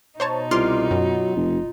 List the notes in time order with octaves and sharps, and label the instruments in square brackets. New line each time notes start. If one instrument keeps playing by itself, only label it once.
[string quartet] B2 D#4 [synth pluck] C5 C#5 A5
[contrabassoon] C2 [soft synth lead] F4 [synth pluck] C6 D6 F6
[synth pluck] F#2 [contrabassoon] F#3
[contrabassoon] F1